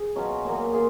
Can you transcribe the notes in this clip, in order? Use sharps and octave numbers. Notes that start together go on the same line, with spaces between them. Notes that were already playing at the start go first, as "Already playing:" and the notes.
Already playing: G#4
B2 F#3 C#4 F4
A#2 F#3 A#3
A#3 F4 G#4